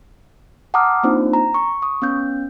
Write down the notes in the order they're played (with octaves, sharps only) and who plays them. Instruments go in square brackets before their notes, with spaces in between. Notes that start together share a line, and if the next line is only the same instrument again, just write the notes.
[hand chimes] F#5 A5 A#5 D6 D#6 F6
A#3 C4 D4 D#4 F4 C5
A#5
C#6
C#6 D#6
B3 C#4 G6